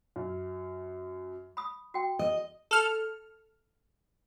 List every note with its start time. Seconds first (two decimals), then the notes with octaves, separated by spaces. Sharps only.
0.16 F#2
1.57 B5 D#6
1.94 F#4 G5
2.19 D#5
2.71 A4 F6